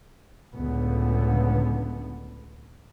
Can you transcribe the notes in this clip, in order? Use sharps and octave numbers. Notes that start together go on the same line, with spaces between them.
C#2 A2 D3 B3